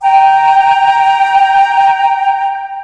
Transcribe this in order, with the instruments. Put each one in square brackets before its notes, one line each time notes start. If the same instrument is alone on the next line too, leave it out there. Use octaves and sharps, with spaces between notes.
[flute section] G5 A#5